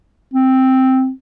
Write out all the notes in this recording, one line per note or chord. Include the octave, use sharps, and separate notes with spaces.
C4